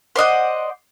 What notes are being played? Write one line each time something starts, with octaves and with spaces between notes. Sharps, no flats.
C5 D5 D#5 F#5